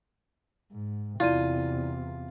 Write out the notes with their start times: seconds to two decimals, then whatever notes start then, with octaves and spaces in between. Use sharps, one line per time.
0.71 G#2
1.20 E2 C3 E4 F4 D5 D#7